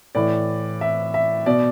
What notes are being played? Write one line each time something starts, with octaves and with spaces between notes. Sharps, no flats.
A2 E3 D5
E5
E5
B2 D5